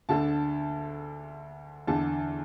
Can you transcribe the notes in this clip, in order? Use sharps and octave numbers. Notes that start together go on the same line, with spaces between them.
D2 D3 A5
E2 D3 A5